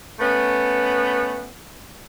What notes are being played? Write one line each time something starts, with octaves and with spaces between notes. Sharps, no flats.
A3 B3 C#4